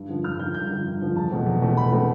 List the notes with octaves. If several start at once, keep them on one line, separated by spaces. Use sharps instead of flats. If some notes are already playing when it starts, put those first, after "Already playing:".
Already playing: G2
D3 F3
G2 F6
D3 F3 G6
G2 G6
D3 F3
G2
D3 F3
E2 A5
B2 A3 C4
E2
B2 A3 C4
E2 B5
B2 A3 C4